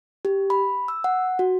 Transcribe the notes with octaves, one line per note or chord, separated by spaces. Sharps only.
G4
B5
E6
F#5
F#4